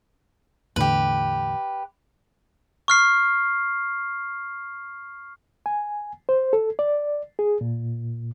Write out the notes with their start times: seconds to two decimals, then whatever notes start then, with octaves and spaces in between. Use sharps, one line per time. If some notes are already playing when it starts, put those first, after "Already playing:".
0.76 E2 A2 D3 G4 B4
2.88 C#6 F6 C7
5.66 G#5
6.29 C5
6.53 A4
6.79 D5
7.39 G#4
7.61 A#2